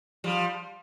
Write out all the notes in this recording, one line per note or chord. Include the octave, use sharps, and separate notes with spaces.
F3 G3